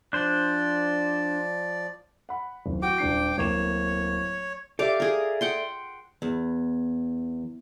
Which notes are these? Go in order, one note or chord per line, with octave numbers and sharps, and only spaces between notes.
F3 D4 C5 D5
F#5 B5
D1 D#3
F#4 G5 D6
D#1 D4 C7
D1 A#3 C#5 E7
G4 A4 D5 E5 F5 D6
G#4 A#4
F#5 G5 C6
E2